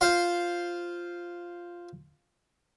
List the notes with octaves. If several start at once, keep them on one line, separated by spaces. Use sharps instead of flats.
F4 C5 F5